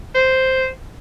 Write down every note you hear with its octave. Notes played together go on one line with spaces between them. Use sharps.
C5